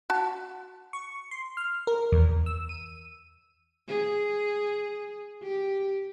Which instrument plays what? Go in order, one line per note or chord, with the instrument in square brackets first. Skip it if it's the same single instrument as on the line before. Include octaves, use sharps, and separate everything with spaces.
[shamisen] F#4 A5
[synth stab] C#6
C6
F6
A#4
E2
E6
D#7
[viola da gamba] G#4
G4